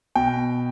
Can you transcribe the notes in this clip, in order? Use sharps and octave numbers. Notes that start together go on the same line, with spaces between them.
B2 G5